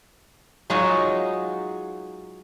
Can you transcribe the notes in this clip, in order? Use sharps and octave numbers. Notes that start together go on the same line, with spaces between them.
F#3 G#3 D#4 F4 F#4 C#5